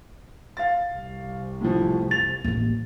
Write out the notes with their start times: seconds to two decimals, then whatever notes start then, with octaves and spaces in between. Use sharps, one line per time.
0.57 F5 A6
0.93 C2
1.61 A2 E3 F3
2.11 A6 F7
2.44 A1 A#3